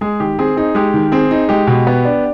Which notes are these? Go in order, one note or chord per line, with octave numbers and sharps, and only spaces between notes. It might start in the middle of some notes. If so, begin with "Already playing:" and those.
G#3 G#4
D#3 G4
C4 G#4
D#4 G#4
G#3 G4
D#3
C4 G#4
D#4
G#3 G4
B2
B3
D4